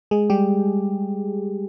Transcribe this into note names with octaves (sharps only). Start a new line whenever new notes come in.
G#3 G#4
G3 G4